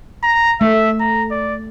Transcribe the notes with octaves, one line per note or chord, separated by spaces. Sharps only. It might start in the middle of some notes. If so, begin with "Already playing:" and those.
A#5
A3 E5
A#5
D5